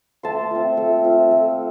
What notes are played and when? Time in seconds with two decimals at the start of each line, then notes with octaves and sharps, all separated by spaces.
0.23 A3 A5 C6
0.51 C4 F4
0.77 A3
1.04 C4 F4
1.31 A3